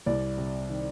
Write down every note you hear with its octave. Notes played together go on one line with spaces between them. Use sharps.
C2 D5
C3
D#3